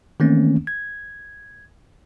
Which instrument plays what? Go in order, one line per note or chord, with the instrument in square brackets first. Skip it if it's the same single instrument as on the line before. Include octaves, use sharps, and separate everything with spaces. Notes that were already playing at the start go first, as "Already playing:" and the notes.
[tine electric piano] D#3 E3 A3 A#3 C4 C#4
G#6